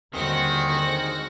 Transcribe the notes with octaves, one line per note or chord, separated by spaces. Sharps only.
D#2 D3 D#3 G3 G#3 C4 F#4 F#5